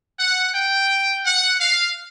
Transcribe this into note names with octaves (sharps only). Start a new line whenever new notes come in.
F#5
G5
F#5
F5